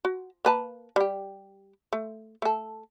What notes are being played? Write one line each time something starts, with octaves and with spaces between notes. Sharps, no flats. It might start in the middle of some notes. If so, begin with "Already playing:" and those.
F#4
A#3 B4 A5
G3 G4
A3
A3 A4